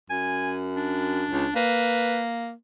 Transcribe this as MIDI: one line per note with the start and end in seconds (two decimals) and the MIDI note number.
0.10 1.25 42
0.10 0.55 80
0.77 1.55 62
1.31 1.46 37
1.56 2.53 58
1.56 2.22 71